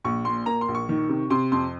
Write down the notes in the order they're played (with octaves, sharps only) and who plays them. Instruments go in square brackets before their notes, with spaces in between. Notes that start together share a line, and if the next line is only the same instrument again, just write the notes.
[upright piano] A#1 C#6
A#2 C6
A#3 A#5
C6
A#1
C#6
D#3
C3
C3 C6
F2 C6